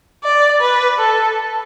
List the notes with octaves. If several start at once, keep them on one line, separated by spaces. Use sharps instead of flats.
D5
B4
A4